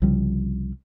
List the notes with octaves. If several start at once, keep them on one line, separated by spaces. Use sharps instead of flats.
C2 C#3 F3 G3